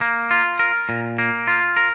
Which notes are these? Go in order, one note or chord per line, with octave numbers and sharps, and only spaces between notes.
A#3
F4
A#4
A#2
A#3
F4
A#4